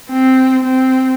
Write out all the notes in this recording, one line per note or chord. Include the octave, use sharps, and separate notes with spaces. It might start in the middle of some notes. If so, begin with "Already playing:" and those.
C4
C4